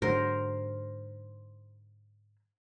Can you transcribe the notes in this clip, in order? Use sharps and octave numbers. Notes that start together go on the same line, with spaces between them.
G#2 D3 F#3 A#4 C5